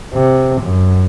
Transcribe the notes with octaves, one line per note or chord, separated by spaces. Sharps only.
C3
F#2